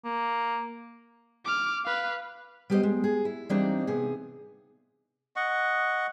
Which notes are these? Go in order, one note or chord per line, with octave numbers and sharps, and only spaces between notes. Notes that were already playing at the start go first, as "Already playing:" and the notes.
A#3
D6 F6
B4 F5
G3 B3 G4 G#4 C5 D#5
G#3
G#4
E4
E3 G3 A#3 C4 D4 D#4
C3 B3 G#4
D#5 F#5 C#6